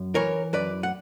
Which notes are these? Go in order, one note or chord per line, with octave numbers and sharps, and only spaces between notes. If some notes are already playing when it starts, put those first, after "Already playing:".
Already playing: F#2
E3 A#4 C#5
F#2 B4 D5
F#5